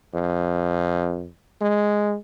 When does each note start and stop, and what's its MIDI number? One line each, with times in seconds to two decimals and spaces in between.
0.14 1.29 41
1.61 2.16 56